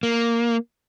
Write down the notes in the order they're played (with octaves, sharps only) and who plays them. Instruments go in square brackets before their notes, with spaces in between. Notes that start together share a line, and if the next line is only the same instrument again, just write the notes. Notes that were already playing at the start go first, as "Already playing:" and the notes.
[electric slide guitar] A#3